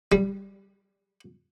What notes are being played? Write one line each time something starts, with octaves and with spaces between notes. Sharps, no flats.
G3